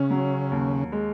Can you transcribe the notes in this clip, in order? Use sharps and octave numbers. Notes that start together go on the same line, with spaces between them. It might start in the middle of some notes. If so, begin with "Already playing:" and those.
Already playing: C#3 C#4
F#3
D#2
G#3